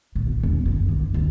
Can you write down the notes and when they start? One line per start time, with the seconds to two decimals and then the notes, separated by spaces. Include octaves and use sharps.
0.15 A2
0.27 B2
0.43 E1
0.66 F#1
0.88 D3
1.14 D2